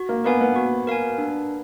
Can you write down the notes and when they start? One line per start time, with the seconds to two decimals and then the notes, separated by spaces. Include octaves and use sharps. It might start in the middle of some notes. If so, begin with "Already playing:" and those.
Already playing: F#4
0.09 A#3
0.24 B3 A#4 F5 G#5
0.41 B3
0.56 F#4
0.87 A#4 F5 G#5
1.18 D4